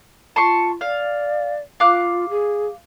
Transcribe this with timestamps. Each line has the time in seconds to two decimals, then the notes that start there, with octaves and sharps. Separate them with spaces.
0.36 F4 A5 C6 C#6
0.81 D5 F5
1.80 F4 F5 D6 F#6
2.30 G#4